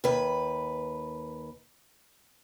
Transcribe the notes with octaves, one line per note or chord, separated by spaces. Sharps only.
D#2 B4